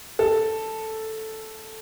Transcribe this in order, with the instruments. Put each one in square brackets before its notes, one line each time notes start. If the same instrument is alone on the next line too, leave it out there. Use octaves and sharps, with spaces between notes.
[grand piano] A4